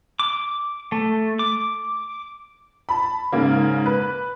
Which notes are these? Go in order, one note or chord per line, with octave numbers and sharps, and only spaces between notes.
D6
A3
D6
A5 B5
G#2 C#3 A#3
B4